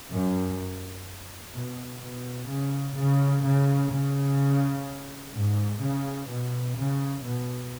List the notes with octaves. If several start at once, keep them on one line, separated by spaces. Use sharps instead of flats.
F#2
B2
B2
C#3
C#3
C#3
C#3
G#2
C#3
B2
C#3
B2